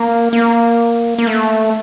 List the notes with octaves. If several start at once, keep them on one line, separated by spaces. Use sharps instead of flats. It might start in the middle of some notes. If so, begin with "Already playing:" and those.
Already playing: A#3
A#3
A#3
A3